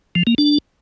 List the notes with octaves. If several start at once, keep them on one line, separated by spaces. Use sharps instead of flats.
F3
A#3
D4